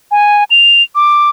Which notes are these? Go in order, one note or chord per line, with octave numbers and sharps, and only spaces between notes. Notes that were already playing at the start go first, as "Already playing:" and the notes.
G#5
F7
D6